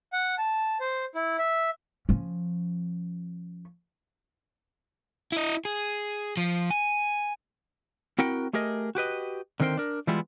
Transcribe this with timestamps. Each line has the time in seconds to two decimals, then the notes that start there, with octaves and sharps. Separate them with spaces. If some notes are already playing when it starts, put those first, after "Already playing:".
0.13 F#5
0.38 A5
0.80 C5
1.15 E4
1.39 E5
2.09 F3 C#4
5.32 E4 D#5
5.65 G#4
6.37 F3
6.70 G#5
8.19 C4 E4 F#4 A#4 F#5 G5
8.53 A3 G4 G#4 A#4 D#5
8.95 F#4 G4 B4 D#5
9.60 D3 D#3 C4 A#4 C5 G5
9.77 D4 A#4
10.07 E3 G3 G#3 B3 E4 F4